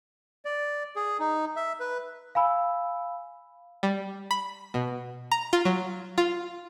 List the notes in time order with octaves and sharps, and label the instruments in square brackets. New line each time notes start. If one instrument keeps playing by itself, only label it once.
[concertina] D5
G#4
D#4
E5
B4
[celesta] F5 G#5 B5 E6
[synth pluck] G3
B5
B2
A#5
F4
F#3
F4